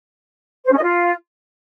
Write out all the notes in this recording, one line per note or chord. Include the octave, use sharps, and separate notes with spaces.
C5
C#4
D#5
F4